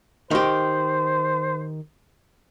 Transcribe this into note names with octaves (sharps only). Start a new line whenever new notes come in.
D#3 G4 C5